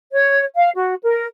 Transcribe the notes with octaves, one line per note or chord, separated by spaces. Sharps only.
C#5
F5
F#4
A#4